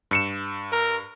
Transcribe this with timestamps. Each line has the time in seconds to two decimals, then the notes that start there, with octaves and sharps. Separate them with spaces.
0.11 G2 C#7 E7
0.72 A#4